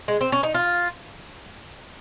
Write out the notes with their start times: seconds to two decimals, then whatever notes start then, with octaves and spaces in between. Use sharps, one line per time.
0.08 G#3
0.21 C4
0.32 C#4
0.43 D#4
0.54 F4